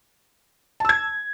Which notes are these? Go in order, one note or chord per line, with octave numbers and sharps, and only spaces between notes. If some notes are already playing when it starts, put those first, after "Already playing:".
A5 E6 G#6